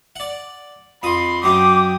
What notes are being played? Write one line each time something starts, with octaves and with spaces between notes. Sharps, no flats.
D5 F#5
F2 B5 C6 D#6
F#2 F#3 G5 D6 D#6